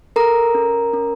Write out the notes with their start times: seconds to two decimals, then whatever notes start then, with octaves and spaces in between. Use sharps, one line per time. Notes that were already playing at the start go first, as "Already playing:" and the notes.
0.16 A4 A#4 A#5
0.54 C#4
0.93 C#4